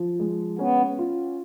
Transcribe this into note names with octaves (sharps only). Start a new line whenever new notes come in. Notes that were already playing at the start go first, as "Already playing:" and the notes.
Already playing: F3
G#3
B3 C#4
F4